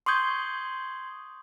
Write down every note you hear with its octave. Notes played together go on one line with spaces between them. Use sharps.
C6 C#6 D#6 G6 G#6